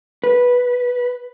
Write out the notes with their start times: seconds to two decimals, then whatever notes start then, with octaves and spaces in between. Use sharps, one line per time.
0.24 B4